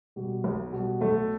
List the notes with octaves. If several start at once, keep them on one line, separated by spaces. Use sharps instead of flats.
B2 G3
B1
B2 G3
B1 A3 A4